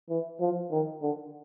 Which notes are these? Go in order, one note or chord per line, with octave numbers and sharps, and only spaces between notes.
E3
F3
D#3
D3